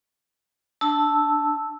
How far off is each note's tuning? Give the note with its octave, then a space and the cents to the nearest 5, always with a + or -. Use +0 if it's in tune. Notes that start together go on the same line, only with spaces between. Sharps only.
D4 +0 A5 +0 E6 -10